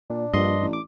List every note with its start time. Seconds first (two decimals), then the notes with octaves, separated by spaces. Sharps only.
0.10 A#2 D4
0.33 A#1 G2 D#5 C6
0.61 A1
0.73 D6